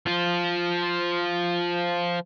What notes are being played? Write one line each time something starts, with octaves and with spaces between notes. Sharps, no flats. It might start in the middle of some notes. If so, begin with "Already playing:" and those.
F3 F4